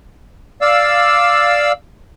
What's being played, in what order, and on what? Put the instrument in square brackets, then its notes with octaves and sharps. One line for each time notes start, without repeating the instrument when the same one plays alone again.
[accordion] D5 F5 E6